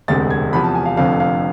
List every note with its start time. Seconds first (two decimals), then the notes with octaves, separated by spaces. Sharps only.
0.08 E1 D2 C3 G#3 A6
0.30 G#6
0.53 E2 C3 F3 B5
0.64 A5
0.75 G#5
0.86 F5
0.97 F1 F2 D3 F3 F5
1.20 F5